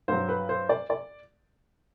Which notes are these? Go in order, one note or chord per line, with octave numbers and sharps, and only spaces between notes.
G2 F#3 C5
B4
C5
D5
D5